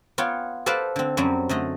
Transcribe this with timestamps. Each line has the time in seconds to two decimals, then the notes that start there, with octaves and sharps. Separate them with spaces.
0.18 B3 F4 C#5 G5
0.66 A4 B4 C5 D5 F5 A5
0.96 D3 C4
1.17 F#2 F#3 G3 C4
1.49 D3 A3 D#5